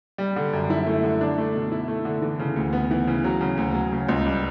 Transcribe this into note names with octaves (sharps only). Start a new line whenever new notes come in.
G3
D3
F#2
E4
A3
D3
D4
A3
B2
E4
A3
D3
E3
C#3
D2
B3
E3
C#3
F#3
C#3
D2
F#3
C#3
C#2
G3